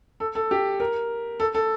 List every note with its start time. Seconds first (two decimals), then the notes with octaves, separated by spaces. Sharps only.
0.20 A4
0.35 A4
0.51 G4
0.80 A#4
1.40 A4
1.55 A4